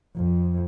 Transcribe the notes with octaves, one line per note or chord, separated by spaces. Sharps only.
F2